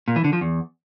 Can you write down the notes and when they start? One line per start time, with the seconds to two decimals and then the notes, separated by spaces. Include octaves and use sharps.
0.08 A#2
0.16 E3
0.24 D3
0.33 F3
0.41 E2